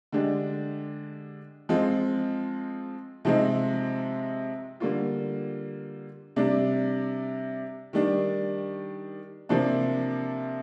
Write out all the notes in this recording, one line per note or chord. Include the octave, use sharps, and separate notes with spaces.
D3 G#3 D4 G4
F3 G#3 C4 F4
C3 F3 G#3 C4 D#4
D3 G3 A#3 F4
C3 G3 D4
D#3 G3 D4
C3 F3 A#3 D4